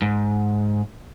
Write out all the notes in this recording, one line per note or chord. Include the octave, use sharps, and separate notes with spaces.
G#2